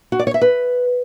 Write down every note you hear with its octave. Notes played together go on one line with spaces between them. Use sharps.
F#4
D5
C#5
E5
B4